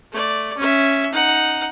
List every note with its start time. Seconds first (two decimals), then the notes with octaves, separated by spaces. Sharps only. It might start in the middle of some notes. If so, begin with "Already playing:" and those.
0.12 A3 D5
0.57 C#4 E5
1.13 D#4 F#5